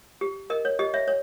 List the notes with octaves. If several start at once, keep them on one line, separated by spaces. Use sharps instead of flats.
G4
A#4 D#5
C#5
G4 D#5
C#5 E5
C#5